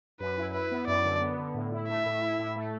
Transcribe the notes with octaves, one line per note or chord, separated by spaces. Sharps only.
F#2 B4
E4
E4 B4
B3
F#2 D5
D3
B3
D3
A2
E4
A3 E5
A2
E4
A2
A3